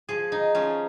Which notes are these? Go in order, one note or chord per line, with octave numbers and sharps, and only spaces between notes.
F3 G#4
D#4
F3 C#4